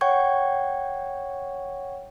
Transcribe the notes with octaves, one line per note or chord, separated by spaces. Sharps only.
C#5 F#5 G5 C#6 G#6